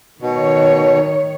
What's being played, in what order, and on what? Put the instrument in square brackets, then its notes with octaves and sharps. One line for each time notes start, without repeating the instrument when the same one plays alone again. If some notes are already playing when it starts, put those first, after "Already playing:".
[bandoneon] B2 [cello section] D#3 C#5